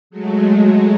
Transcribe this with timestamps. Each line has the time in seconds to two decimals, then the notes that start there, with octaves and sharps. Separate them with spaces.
0.10 F#3 G#3 A3